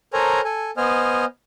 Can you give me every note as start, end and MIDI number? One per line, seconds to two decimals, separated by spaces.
0.13 0.41 69
0.13 0.41 70
0.13 0.41 72
0.13 0.41 73
0.13 0.41 80
0.13 0.41 82
0.44 0.71 69
0.44 0.71 80
0.77 1.25 59
0.77 1.25 72
0.77 1.25 75
0.77 1.25 80
0.77 1.25 89